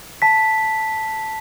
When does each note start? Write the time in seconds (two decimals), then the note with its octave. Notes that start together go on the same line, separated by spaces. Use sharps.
0.22 A5 B6